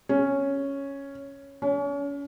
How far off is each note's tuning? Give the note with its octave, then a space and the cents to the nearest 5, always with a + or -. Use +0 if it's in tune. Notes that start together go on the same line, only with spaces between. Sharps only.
C#4 +0
C#4 +35